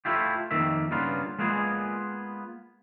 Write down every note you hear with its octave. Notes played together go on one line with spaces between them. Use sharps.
A3 E4 F4 G4
F2 D#3 A#3 E5
G2 C#3 A#3 B3 F4
G#3 A#3 B3 F4 G#4